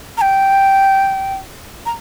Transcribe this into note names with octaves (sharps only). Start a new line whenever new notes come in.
A#5
G5
A#5